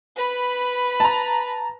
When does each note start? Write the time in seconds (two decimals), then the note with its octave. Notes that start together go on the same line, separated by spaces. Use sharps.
0.16 B4 B5
1.00 A5 A#5